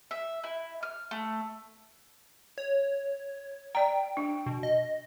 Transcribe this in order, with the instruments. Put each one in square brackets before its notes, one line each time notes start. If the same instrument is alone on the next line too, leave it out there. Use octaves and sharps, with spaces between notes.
[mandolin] E5
E4
F6
A3
[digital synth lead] C#5
[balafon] D5 A#5 [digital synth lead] G5
[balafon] D4
[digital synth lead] B2
D#5